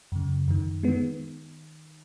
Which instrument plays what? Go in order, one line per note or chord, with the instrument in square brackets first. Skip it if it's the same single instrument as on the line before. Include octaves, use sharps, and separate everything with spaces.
[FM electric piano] F#2 C#3
F#2 D#3
G#3 B3
D#3